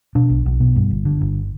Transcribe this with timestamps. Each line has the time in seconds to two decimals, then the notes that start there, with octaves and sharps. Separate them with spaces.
0.15 B2 D4
0.30 B1
0.46 B1
0.60 B2
0.76 G2
0.91 G1
1.05 D3
1.21 G1